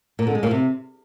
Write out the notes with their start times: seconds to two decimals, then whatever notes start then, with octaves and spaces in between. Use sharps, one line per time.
0.19 A#2
0.27 D3
0.35 G#3
0.43 A#2
0.51 C3